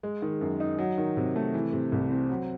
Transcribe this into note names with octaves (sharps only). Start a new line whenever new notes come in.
G#3
D#3
F#2
D#4
F#3
D#3
C3
A3
E3
C3
C2
C4
F#3